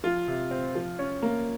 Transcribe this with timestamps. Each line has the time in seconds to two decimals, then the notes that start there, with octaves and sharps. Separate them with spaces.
0.04 F3 F4
0.28 C3
0.51 C4
0.75 F3
0.99 C#4
1.22 A#3